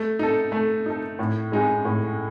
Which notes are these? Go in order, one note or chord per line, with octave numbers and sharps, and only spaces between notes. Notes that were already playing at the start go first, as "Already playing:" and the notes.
Already playing: A3
D#4 A4
A3
D#4 A4
A2
G#3 D#4 G#4
A2